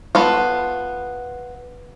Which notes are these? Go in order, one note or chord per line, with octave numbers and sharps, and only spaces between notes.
B3 F4 A4